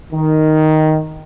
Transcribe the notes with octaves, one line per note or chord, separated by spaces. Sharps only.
D#3